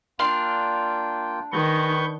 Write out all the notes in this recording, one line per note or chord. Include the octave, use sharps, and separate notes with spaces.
A#3 D4 F4 F5 G5 C6
D#3 G#4 B4 C#6 G6